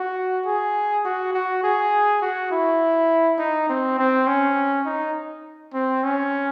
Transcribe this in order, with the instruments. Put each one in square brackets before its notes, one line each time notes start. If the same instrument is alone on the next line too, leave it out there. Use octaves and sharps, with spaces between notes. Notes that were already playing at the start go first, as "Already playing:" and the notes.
Already playing: [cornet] F#4
G#4
F#4
F#4
G#4
F#4
E4
D#4
C4
C4
C#4
D#4
C4
C#4